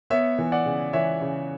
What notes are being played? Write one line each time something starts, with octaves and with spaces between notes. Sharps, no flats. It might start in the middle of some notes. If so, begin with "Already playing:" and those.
B3 C#5 E5
E3
D5 F#5
C#3
E3 C#5 E5
C#3